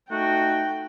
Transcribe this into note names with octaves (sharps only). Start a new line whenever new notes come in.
A3 D#4 F#4 G5